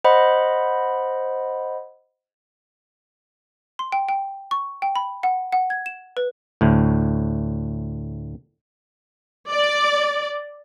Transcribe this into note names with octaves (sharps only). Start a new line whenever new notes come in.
C5 D#5 F#5 B5
C6
G5
G5
C#6
G5
B5
F#5
F#5
G#6
E7
B4
D2 A2
D5